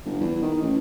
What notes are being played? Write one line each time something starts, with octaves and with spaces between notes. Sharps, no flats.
G1
E2
D#3
A1